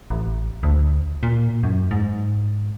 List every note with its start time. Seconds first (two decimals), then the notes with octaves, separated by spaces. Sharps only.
0.10 A1
0.63 D2
1.23 A#2
1.63 F#2
1.91 G#2